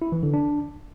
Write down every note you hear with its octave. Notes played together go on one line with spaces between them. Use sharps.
E4
E3
D3
D4